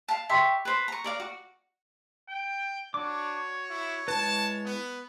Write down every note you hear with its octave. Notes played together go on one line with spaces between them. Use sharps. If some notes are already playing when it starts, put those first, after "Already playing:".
F5 A5
G4 E5 C6 C#6
B4 C5
A#5 C#6
A#4 D5 F5
F#4
G5
D4 F#4 C#5 D6
E4
G#3 E4 B4 A5
B3